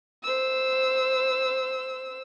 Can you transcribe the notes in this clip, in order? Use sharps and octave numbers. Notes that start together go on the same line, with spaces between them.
C5 E6